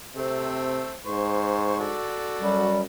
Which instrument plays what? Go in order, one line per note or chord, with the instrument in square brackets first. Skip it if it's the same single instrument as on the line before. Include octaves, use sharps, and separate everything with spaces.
[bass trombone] C3 [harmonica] A3 C4 A4
[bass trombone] G#2 [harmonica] C5 C#6
[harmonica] F#4 A4 D5
[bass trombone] F#2 [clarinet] G3